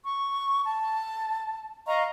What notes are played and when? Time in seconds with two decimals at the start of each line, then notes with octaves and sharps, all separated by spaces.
0.04 C#6
0.67 A5
1.87 D#5 F5 A#5 C#6